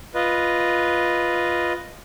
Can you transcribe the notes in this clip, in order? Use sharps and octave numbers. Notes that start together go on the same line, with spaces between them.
F4 B4 D#5